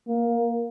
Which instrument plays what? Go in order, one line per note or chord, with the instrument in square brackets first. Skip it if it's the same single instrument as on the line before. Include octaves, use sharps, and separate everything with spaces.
[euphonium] A#3